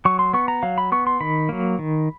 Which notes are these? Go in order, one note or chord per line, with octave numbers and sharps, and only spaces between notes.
F#3 C#6
C6
B3 C#6
A#5
F#3 F5
B5
B3 C#6
C6
D#3 B5
F#3 A#3
D#3